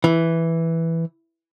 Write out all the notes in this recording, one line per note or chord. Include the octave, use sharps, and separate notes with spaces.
E3